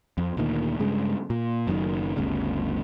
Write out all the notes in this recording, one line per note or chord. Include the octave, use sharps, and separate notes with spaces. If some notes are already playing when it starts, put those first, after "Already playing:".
F2
D2 A#2 D#3
G2 C#3 G#3
A#2
F#1 F#2 B2 D#3
G1 D2 C#3